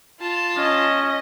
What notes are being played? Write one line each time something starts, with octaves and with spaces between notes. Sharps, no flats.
F4 A5
C#4 D#5